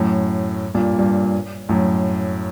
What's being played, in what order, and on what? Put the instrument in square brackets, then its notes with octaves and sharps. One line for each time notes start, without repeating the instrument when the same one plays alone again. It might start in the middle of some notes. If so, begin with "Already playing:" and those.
Already playing: [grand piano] F#2 A2
G2 A#2
G2
F#2 A2